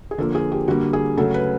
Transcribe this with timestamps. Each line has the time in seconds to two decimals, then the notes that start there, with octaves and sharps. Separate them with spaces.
0.11 G#4
0.18 D3 F3 A#3 A4
0.35 G#4
0.52 G4
0.68 D3 G3 A#3 F#4
0.93 G#4
1.17 C#3 F#3 A3 A4
1.34 B4